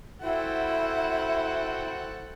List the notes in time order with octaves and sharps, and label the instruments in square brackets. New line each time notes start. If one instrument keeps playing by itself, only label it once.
[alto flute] E4 [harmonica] F#4 C5 G5 [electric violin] A4 F#5 [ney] E5